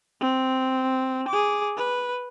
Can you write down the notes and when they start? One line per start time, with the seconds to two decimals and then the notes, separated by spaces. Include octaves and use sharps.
0.20 C4
1.28 G#4 D6
1.77 B4